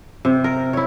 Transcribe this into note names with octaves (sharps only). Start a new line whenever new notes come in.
C3
A#4
E4 C#5